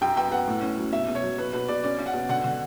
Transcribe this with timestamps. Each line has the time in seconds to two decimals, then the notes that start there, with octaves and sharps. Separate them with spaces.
0.01 F#2 G5
0.17 B3 G5
0.31 B3 F#5
0.48 A2
0.62 C#4
0.78 F#3
0.92 B2 E5
1.08 B2
1.15 C#5
1.23 F#3
1.38 B2 B4
1.53 B2 B4
1.68 B2 D5
1.84 C#4 D5
1.99 C#4
2.06 F#5
2.14 B2
2.29 D3 F#5
2.44 D3